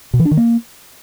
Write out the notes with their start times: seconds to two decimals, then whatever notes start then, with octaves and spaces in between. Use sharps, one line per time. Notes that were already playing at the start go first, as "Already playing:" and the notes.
0.14 B2
0.19 E3
0.25 D4
0.31 D#3
0.37 A#3